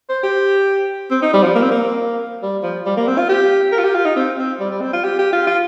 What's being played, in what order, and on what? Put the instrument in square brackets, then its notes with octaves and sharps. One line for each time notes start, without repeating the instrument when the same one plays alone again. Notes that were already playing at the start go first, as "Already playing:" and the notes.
[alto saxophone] C5
G4
C4
D#4
G3
F3
A#3
C4
A#3
G3
F3
G3
A#3
C4
F4
G4
A#4
F4
G4
F4
D#4
C4
C4
G3
G3
C4
F4
G4
G4
F4
F4